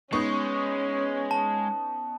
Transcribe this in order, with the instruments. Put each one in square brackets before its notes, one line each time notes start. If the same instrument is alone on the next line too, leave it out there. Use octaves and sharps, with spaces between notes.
[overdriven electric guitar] G#3 [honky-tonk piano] B3 D#4 C#6 [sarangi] C#4
[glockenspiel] A5